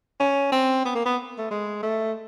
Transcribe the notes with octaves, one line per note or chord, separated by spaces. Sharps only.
C#4
C4
B3
A#3
B3
A3
G#3
A3